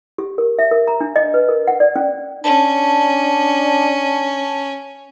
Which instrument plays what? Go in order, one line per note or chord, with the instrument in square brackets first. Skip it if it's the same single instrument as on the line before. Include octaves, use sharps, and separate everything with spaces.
[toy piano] G4
A#4
E5
A#4
A#5
D4
D#5
B4
A#4
F#5
D5
C#4
[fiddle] C#4 [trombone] D4 [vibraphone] A5